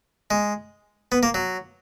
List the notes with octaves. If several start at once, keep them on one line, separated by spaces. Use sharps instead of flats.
G#3
B3
A#3
F#3